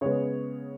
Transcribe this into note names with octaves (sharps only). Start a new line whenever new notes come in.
C#3 G#3 B3 C#5